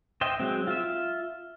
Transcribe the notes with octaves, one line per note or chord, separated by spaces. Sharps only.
C5 D#5 E5 G5
F#3 G#3 C4
F4 E5